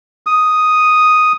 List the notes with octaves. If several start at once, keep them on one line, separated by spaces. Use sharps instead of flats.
D#6